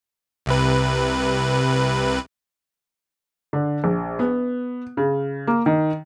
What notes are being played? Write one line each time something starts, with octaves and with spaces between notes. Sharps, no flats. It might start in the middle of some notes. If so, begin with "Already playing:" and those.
C2 C3 B4
D3
A#1
B3
C#3
A#3
D#3